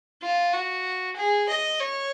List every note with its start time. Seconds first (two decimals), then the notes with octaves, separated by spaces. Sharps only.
0.22 F4
0.53 F#4
1.16 G#4
1.49 D#5
1.80 C#5